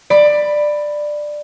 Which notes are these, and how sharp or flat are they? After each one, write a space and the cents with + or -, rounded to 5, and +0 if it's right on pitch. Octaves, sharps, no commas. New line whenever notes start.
D5 +15 B5 +5